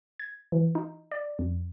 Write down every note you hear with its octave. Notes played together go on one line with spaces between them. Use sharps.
G#6
E3
D#4
D5
F2